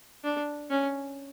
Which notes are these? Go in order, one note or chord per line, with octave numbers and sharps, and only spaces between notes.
D4
C#4